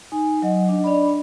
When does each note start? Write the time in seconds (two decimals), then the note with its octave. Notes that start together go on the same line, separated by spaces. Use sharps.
0.12 D#4 G#5
0.42 F#3 D#5 F#5
0.69 D4 D#5
0.84 D4 D5 B5